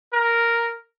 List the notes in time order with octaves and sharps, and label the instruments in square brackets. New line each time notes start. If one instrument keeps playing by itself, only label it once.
[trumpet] A#4